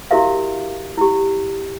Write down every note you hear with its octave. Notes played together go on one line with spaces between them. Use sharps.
E4 F#4 G4 A#4 E5 F5
E4 G4